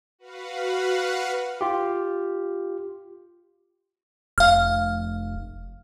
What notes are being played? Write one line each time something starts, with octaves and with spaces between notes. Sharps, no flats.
F#4 B4 F5 F#5
F4 G4
F1 F5 F6